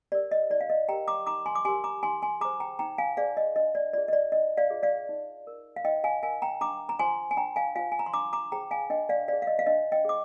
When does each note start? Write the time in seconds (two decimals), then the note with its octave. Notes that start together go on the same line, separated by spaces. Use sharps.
0.12 G4 A#4 D5
0.31 D#5
0.50 D#4 D5
0.61 F5
0.70 D#5
0.88 G4 A#4 G5 A#5
1.08 A#5 D6
1.27 D#4 A#5 D6
1.46 G#5 C6
1.55 D6
1.65 G4 A#4 G#5 C6
1.84 A#5 D6
2.03 D#4 G#5 C6
2.22 G#5 C6
2.41 G#4 C5 A#5 D6
2.60 G5 A#5
2.79 D#4 G5 A#5
2.98 F5 G#5
3.17 G#4 C5 D5 F5
3.37 D#5
3.56 D4 D#5
3.75 D5
3.93 F4 G#4 D5
4.08 D#5
4.13 D5
4.32 D4 D#5
4.57 D5 F5
4.70 F4 G#4
4.83 D5 F5
5.09 D#4
5.47 A#4
5.76 F5
5.84 D#4 D#5 G5
6.04 F5 G#5
6.23 A#4 F5 G#5
6.42 G5 A#5
6.61 D4 A#5 D6
6.89 A#5
6.99 F4 C5 G#5 C6
7.31 G#5
7.37 D4 G5 A#5
7.56 F5 G#5
7.76 F4 C5 F5 G#5
7.92 G#5
7.99 A#5
8.06 C6
8.13 D4 A#5 D6
8.33 A#5 D6
8.52 G#4 C5 G5 A#5
8.71 F5 G#5
8.90 D4 D#5 G5
9.09 D5 F5
9.28 G#4 C5 D5 F5
9.42 F5
9.47 D#5
9.59 F5
9.66 D4 D#5
9.92 D#5 G5
10.05 G#4 C5 D6